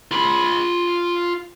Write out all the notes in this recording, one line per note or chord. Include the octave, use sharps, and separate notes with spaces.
F4 B5